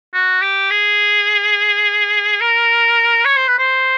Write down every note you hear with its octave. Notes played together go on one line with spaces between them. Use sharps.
F#4
G4
G#4
A#4
C#5
C5
B4
C5